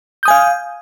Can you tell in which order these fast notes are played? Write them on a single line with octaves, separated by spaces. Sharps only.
G6 D#6 G#5 F5